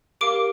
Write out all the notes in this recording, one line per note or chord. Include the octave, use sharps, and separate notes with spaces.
G4 A#4 F5 D6 D7